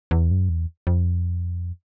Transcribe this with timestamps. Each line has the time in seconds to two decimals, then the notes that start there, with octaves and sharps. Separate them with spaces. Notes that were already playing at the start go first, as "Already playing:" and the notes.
0.11 E2
0.31 F#2
0.49 E2
0.87 F2